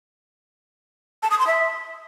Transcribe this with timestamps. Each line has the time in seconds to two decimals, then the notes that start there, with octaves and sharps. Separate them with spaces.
1.23 A5
1.31 D#6
1.39 C6
1.47 E5